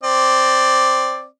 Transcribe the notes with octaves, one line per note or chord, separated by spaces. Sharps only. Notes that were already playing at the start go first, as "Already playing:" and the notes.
C4 D5